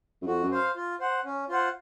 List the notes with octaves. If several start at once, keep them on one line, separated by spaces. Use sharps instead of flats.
F#2
F2 F#4
F#2
C5 F5
F4
C5 F#5
C#4
F4 C5 F#5